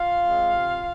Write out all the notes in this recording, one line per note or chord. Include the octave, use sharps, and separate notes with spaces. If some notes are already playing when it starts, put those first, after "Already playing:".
Already playing: F4 F5
G#3 C4
C3